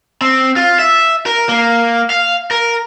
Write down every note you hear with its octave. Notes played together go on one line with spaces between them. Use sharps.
C4
F4
E5
A#4
A#3
F5
A#4